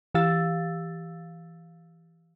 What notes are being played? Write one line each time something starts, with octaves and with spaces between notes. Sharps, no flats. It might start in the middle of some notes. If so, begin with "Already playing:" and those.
E3 G4 F5 E6 A6